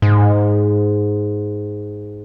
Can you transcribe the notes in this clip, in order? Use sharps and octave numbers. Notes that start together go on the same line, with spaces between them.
G#2